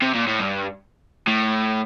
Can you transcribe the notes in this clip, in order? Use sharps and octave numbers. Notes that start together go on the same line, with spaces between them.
C3
A#2
A2
G2
A2